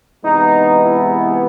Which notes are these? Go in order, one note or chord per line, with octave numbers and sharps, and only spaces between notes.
C3 E3 G#3 B3 D#4
E4